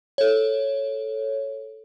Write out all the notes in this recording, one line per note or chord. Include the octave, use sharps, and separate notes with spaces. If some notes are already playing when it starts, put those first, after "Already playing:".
A4 C#5